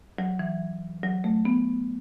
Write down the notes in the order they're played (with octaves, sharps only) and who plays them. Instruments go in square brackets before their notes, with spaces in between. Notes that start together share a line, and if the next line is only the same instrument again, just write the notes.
[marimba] F#3
E3
F#3
A3
B3